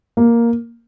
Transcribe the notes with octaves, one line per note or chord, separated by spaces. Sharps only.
A#3